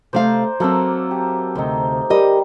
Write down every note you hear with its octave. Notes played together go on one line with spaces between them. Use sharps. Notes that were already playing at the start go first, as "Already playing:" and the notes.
C3 A3 C5 D5 F5 A#5
F#3 A#3 C4 A4 E5
G4
D2 C3 C4 D#4
G3 G4 A#4 D#5